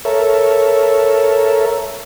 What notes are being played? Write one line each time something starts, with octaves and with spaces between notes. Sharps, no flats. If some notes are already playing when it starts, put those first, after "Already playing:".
A4 A#4 C#5 E5